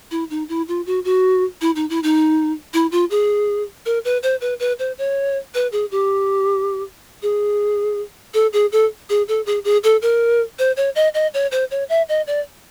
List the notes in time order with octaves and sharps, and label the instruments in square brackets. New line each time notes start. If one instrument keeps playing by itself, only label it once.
[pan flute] E4
D#4
E4
F4
F#4
F#4
E4
D#4
E4
D#4
E4
F4
G#4
A#4
B4
C5
B4
B4
C5
C#5
B4
G#4
G4
G#4
A4
G#4
A4
G#4
A4
G#4
G#4
A4
A#4
C5
C#5
D#5
D#5
C#5
C5
C#5
E5
D#5
D5